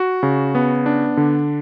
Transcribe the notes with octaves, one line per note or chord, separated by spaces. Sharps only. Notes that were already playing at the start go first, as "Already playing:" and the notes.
Already playing: F#4
C#3
B3
D4
D3